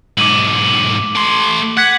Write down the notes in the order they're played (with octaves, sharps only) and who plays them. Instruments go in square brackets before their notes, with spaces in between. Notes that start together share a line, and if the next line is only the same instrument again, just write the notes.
[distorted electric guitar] B1 G#2 [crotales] D6 D#7 F#7
[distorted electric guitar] A3 C6
[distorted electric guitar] F#5 [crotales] F#6 G#6 B6